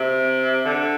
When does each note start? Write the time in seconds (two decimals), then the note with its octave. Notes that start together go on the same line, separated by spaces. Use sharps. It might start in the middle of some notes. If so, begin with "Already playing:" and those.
Already playing: C3
0.66 D3